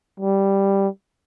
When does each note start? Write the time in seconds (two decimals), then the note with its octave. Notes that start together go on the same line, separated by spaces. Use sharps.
0.20 G3